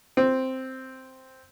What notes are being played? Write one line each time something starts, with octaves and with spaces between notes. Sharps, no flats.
C4